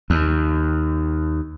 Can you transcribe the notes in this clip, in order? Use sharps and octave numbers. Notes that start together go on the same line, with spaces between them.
D#2